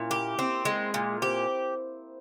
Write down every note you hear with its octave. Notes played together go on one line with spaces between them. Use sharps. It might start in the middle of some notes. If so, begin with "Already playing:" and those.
Already playing: A#2 C#4 E4
A#3 G4 A#4
C4
G#3
A#2
C4 G4 C5